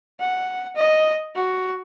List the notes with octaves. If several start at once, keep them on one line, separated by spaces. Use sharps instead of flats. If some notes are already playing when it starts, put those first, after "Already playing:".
F#5
D#5
F#4